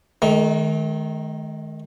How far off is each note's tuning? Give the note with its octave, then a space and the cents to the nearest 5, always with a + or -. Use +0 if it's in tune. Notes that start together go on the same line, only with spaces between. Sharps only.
D#3 +0 A3 -45